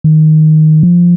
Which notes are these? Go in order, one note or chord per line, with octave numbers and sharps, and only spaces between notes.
D#3
F3